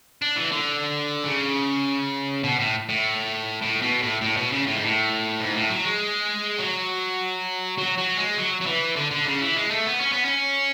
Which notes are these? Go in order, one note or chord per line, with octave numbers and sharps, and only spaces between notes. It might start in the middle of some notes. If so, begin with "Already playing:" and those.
D4
E3
D3
C#3
B2
A2
A2
A2
B2
A2
A2
B2
C#3
A2
G#2
A2
G#2
A2
F#3
G#3
F#3
F#3
F#3
G#3
F#3
F#3
E3
D3
D3
C#3
E3
G#3
A3
B3
C#4
B3
C#4